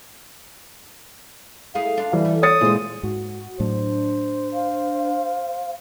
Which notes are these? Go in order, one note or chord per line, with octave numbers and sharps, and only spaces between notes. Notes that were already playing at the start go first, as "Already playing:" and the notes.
A3 E4 G#4 F5
D4 F4
E3 G3
A3
C#5 D#6 A6 C#7
A#2 G#3 C4 E4 C5
G#2 F#4
A2 F#3 D4 C5
F5